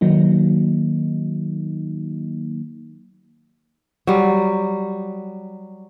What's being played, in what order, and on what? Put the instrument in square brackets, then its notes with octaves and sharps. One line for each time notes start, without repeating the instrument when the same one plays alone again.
[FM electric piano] D#3 F#3 A#3 D#4
[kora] F#3 G3